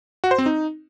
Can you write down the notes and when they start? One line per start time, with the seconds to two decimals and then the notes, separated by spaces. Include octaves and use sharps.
0.24 F#4
0.31 C5
0.38 C4
0.46 D#4